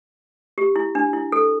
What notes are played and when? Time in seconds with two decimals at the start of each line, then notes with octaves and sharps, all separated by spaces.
0.58 G4
0.76 E4
0.95 D4
1.13 E4
1.32 A4